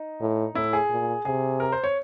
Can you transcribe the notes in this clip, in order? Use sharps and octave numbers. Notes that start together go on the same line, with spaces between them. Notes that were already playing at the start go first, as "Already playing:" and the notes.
Already playing: D#4
A2
A2 E4
G#4
A#2
C3 G#4
A#4
C5
C#5